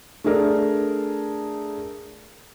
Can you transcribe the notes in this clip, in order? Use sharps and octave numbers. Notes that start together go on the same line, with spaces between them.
A3 D4 G#4 A#4